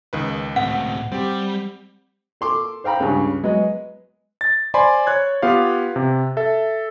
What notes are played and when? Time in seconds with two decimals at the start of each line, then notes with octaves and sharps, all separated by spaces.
0.13 C#2 D#3 B4
0.56 A2 C4 F#5
1.12 G3 C4 G4
2.41 A4 C6 D6
2.84 C5 F5 G5 A#5 B5
3.00 C#2 G2 C#3
3.43 F#3 G#3 B3 B4 D#5
4.41 A6
4.74 C5 D5 G#5 B5 C6
5.07 C#5 F#6 G#6
5.42 B3 F4 G4 F5
5.96 C3
6.37 A4 E5